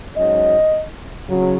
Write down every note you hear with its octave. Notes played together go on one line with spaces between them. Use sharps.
G#2 F#3 C#4 D#5
C#3 F#3